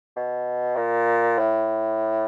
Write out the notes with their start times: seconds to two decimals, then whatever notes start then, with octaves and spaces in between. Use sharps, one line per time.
0.16 B2
0.76 A#2
1.38 A2